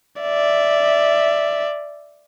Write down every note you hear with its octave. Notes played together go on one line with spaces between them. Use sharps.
D5 E5